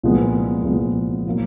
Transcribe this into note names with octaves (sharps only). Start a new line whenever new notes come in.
C2 A#2 F3 G#3 B3
C2 A#2 F3 G#3 B3
A#2 F#3 A#3